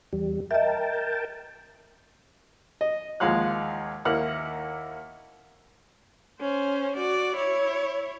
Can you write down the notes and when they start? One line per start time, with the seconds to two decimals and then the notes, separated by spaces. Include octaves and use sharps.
0.13 E2 G3
0.51 A#4 D#5 E5 G5 A5
2.81 D#5
3.20 D#2 F3 G#3 F5 F#5 F#6
4.05 D#2 A#3 E4 F#5 F6
6.40 C#4 C5
6.96 F#4 D5
7.36 E4 C#5